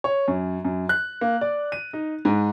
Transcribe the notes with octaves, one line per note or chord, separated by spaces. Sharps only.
C#5
F#2
F#2
F#6
A#3
D5
D#7
D#4
G#2